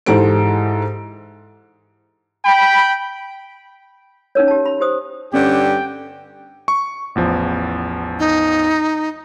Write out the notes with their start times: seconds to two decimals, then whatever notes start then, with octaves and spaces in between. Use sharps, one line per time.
0.06 G#2 E3 G4 A4 C5 D7
2.45 G5 B5
4.35 C#4 D#4 A#4 C#5
4.48 G4 A5
4.66 B5
4.81 G4 C5 D#6
5.33 G2 D3 C#4 G4 G5
6.68 C#6
7.15 A1 E2 F3
8.19 D#4